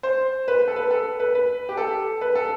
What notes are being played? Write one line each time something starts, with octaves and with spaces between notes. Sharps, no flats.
C5
B4
A4
B4
A4
B4
B4
G4
A4
B4
A4